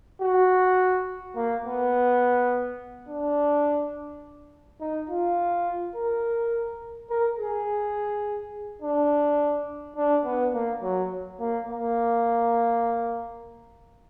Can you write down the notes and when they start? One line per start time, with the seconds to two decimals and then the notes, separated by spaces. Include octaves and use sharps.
0.22 F#4
1.36 A#3
1.65 B3
3.08 D4
4.81 D#4
5.10 F4
5.96 A#4
7.10 A#4
7.38 G#4
8.82 D4
9.96 D4
10.25 B3
10.53 A#3
10.82 F#3
11.40 A#3
11.69 A#3